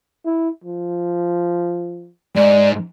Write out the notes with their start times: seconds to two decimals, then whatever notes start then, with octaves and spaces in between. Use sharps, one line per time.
0.25 E4
0.64 F3
2.36 G#2 D5